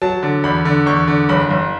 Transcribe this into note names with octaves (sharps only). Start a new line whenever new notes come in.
F#3 A5
D3
E2 B5
D3
E2 C#6
D3
F#1 B5
F#1